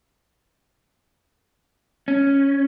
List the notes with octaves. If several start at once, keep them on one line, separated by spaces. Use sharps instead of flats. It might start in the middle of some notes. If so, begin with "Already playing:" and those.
C#4